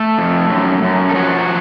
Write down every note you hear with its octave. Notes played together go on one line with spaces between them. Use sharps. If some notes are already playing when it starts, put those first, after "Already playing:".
Already playing: A3 A4
F2
F#2
F#2
A4
F3 F#3 F#4